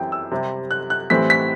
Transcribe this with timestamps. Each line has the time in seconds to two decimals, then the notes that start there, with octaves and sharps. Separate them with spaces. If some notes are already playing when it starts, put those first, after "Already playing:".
Already playing: F#2 E3 G3 C4 G5
0.12 E6
0.31 C3 G3 C4
0.71 F#6
0.90 F#6
1.10 A2 E3 G3 C4 B6
1.30 B6